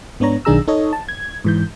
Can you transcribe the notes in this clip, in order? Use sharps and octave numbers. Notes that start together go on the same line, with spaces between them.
G#2 B3 D4 C#5 A#5
B1 D#3 D4 G#4 A#5 E6
D#4 A4 C#5 D#5
A5
G#6
G#2 E3 G6